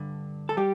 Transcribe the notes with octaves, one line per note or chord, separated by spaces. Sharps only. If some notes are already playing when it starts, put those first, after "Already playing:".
Already playing: G2 D3
A4
G3 G4